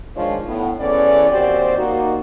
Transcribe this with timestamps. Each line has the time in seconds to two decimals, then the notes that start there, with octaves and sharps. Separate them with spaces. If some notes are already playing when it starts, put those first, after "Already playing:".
0.15 D#3 F3 G#3 D4 F4 C#5
0.47 A2 B3
0.80 E2 E3 C#4 A4 D5
1.31 D#2 C4 F#4 G4 C5 D5
1.78 A#3 D#4 F#4